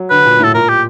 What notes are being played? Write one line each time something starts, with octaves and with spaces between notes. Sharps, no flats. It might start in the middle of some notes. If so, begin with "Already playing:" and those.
Already playing: F#3
D3 B4
A#2
A2 A4
A#2 A#4
G4